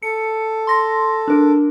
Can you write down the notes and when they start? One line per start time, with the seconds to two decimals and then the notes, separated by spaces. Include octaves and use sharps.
0.02 A4 C#7
0.67 C6 A#6
1.28 D4 A#4